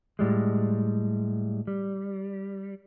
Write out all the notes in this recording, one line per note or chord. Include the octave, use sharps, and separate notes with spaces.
A2 G3 G#3
G3